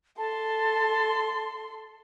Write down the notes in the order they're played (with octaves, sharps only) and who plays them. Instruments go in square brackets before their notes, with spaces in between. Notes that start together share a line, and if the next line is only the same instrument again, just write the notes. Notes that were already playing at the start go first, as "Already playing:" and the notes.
[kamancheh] A4 C6 [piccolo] A5